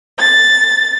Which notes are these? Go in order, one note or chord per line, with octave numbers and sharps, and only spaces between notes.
A6